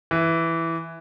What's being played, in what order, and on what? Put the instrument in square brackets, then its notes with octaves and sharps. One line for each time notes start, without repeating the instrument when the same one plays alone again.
[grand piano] E3